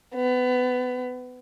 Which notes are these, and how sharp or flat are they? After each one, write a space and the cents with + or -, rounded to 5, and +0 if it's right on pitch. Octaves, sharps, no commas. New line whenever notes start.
B3 +25